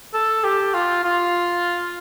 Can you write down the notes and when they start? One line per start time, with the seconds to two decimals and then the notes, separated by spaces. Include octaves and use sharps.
0.14 A4
0.44 G4
0.74 F4
1.04 F4